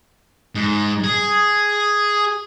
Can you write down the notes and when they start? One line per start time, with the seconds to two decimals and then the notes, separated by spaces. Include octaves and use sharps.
0.55 G#2
1.04 G#4